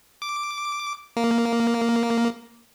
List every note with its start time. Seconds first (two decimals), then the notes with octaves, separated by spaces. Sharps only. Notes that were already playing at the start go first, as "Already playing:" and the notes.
0.22 D6
1.17 A#3